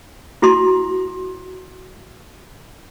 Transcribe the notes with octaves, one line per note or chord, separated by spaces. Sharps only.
E4 F#4 A#5 C6